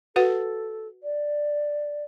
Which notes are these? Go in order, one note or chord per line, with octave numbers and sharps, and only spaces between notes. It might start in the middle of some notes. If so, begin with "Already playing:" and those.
F#4 A4 B4 F#5
D5